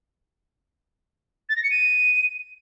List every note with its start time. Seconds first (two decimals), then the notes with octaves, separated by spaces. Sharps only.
1.49 A6
1.56 A#6
1.63 C#7
1.70 D#7